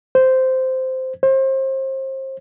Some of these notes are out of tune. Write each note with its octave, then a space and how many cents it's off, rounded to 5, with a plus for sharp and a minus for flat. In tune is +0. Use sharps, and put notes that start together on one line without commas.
C5 -10
C5 +30